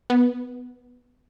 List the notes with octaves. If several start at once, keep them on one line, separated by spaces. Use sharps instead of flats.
B3